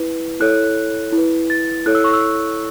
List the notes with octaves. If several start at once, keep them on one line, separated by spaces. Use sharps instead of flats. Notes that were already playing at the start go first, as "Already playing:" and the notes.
Already playing: E4 B4
E4 A4 C#5 F#6
E4
B4
A6
E4 A4 C#5 F#6
E6
C#6
E6